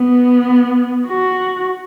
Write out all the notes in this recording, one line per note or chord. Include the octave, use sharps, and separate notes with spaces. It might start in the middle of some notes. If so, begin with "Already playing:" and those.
Already playing: B3
F#4